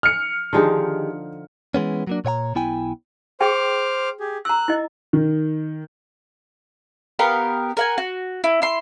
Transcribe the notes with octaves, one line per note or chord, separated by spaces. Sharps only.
F6 C#7
D3 D#3 F3 D#4 G4 G#4
E3 G#3 B3 C#4
F#3 A#3 D4
A#2 C#5 F#5 A#5
B1 B3 E4 G5 G#5
G#4 C5 G5 D6 F6
G4 G#4
A#5 E6 F#6
E4 D#5
D#3
B3 G4 A#4 F5
A#4 F#5 G#5
F#4
E4
E4 C6